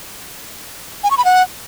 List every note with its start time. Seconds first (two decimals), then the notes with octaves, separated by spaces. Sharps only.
1.03 G#5
1.11 C#6
1.18 B5
1.25 F#5